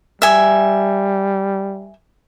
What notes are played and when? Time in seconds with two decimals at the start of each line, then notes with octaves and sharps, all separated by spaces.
0.22 G3 E5 G#5